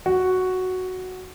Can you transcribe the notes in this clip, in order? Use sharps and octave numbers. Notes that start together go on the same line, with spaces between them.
F#4